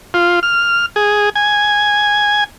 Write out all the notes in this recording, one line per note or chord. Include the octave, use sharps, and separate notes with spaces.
F4
F6
G#4
G#5